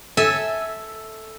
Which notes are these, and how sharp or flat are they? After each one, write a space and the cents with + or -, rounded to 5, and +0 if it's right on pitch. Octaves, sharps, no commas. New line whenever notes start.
A4 +0 E5 -15 G#5 +0